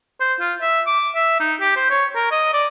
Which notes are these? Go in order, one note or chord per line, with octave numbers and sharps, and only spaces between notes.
C5
F4
E5
D6
E5
D#4
G4
C5
C#5
A#4
D#5
D5